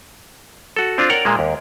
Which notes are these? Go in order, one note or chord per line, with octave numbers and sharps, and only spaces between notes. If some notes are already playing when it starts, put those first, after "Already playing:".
F#4 A4
C4 D4 F4
A#4 C#5 D5 F#5 G5 A#5
A#2 G#3 A#3
D#2